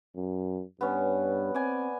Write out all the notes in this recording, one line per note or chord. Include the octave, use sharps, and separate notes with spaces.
F#2
G2 B3 C#4
C4 D5 G#5